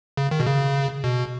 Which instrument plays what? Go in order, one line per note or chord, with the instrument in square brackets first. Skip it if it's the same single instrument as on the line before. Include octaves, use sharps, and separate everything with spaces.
[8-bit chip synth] C#3
D#3
B2
C#3
B2